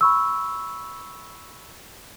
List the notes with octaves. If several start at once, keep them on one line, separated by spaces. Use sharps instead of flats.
B5 C#6 E6